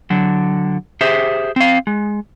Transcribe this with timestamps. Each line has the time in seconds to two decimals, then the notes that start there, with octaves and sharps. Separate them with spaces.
0.10 D3 F#3
1.01 G4 G#4 C5 E5
1.56 C4 F5
1.87 G#3